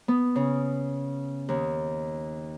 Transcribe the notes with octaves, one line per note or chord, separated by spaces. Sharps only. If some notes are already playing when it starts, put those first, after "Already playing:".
B3
C#3
D#2